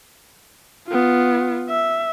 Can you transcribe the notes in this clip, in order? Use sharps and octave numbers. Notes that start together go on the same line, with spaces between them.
B3 F4
E5